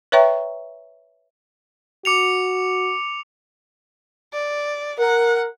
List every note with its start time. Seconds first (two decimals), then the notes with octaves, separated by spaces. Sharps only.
0.12 B4 C#5 E5 G5 A#5 C#6
2.05 F#4 D6 C#7 F7
4.33 D5
4.99 A#4 F#5